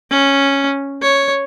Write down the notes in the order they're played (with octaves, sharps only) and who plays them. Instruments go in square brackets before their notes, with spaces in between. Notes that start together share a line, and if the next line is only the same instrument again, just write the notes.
[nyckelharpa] C#4
C#5